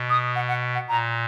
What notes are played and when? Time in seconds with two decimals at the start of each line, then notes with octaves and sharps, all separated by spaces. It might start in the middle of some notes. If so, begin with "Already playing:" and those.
Already playing: B2
0.10 D#6
0.35 F#5
0.48 F#5
0.75 F#5
0.89 A#2 A#5